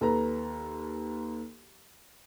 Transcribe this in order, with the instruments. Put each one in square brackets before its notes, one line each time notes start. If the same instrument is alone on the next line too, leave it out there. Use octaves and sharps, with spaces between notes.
[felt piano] D#2 A4 B4 A#5